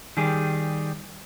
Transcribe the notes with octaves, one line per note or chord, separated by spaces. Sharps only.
D#3 G3 G4 G#4